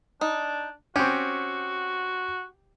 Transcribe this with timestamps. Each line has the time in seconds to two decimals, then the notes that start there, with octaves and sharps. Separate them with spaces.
0.21 D4 D#4
0.96 C4 C#4 F#4 G4